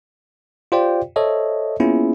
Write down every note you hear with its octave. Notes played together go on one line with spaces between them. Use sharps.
F4 G4 C5 D5 F5 G5
A4 C5 C#5 D#5 E5
A#3 B3 C#4 E4 F4 G#4